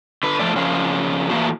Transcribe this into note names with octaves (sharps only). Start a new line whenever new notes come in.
D3 B4
G#2 F3 A3 D5
C#3 F3 C#4 A#4 F5
A2 E3 A3 A#3 C4 F#4